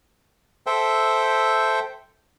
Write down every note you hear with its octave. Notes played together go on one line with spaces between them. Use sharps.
A4 C5 E5 G5